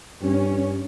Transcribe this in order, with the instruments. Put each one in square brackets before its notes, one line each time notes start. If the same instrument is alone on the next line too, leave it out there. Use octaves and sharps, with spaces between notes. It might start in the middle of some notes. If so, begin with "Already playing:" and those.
[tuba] G2 [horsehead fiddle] C#4